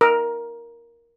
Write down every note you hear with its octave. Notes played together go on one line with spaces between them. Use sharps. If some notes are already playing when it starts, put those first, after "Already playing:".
A#4